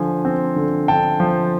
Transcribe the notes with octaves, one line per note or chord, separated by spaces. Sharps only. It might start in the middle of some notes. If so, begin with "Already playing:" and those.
Already playing: D3 F3 G#5
C4
D3
D3 G5 A5
F3